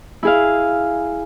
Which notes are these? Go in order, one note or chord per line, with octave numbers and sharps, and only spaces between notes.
E4 G#4 F5